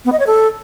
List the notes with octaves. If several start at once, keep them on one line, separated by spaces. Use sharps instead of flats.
B3
D#5
C#5
A4